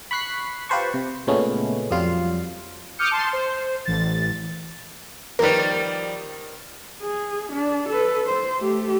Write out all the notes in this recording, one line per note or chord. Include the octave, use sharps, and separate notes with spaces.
B5 C#6 F#6 B6 C7
F4 G4 B4 C5 A5 C#6
C3
A#2 C#3 G#3 A3 B3 C#4
F2 F#3 G3 F4 F5
D6 D#6 F6 G6 C#7
A5 C6
C5
A1 A6
D#3 F3 G3 A#3 A#4 B4
G#4
D4
A4 B4
C5
A3 G4